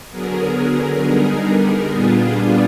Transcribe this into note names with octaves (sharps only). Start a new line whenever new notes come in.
D3 F#3 B3 G#4 A#4
D3 G3 B3 D#4
G#4 A#4
A#2 G3 B3 D4 F4 G#4
G#4